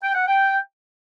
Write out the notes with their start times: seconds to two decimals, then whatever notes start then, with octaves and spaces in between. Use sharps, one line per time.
0.03 G5
0.15 F#5
0.27 G5